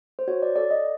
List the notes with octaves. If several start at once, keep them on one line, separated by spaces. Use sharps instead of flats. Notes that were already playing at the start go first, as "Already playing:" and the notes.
C5
F#4 C#5
D5
A4 D5
D#5